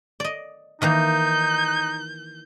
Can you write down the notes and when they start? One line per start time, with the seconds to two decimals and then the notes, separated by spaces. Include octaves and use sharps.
0.20 D5 D#5
0.82 D#3 E3 A#3 D#4 G6